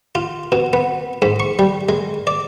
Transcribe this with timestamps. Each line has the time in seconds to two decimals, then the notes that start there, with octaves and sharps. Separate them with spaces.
0.15 F4
0.52 B2
0.73 B3
1.22 G#2
1.40 C#6
1.59 G3
1.89 G#3
2.27 D5